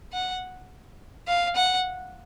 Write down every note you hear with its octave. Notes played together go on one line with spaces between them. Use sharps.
F#5
F5
F#5